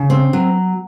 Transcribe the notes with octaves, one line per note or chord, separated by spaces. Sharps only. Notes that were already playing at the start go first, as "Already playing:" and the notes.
Already playing: C#3
C4
F#3